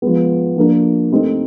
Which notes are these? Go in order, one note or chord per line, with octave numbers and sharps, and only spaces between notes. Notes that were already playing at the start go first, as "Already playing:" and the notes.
F3 G#3 B3
F3 A#3 D4 F4 A#4
A3 C4 D#4 G4